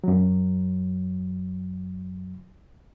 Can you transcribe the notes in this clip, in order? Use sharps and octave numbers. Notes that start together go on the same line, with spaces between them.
F#2 F#3